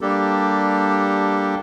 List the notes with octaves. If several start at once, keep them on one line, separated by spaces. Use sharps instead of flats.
G3 A#3 D4 G4 A4